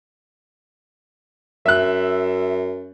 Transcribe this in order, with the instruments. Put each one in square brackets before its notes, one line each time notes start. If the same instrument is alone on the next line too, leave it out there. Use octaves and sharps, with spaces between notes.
[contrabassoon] F#2 [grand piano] E5 F#6